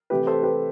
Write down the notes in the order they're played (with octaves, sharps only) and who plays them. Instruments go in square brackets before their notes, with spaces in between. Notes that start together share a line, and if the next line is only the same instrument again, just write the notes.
[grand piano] C3 E3 A3 G4 B4
A4 C5
G4 B4